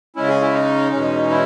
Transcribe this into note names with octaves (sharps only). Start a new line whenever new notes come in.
C#3 G#3 C#4 E4
G#4
E4
D#4
E2 B2 G#3 C#4
E4